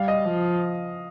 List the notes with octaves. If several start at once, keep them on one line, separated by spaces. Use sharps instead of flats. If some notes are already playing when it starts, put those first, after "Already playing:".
Already playing: G3 F5
D#5
F3